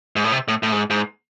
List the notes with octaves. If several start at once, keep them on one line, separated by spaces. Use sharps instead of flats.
G#2
A2
C3
A2
A2
G#2
G#2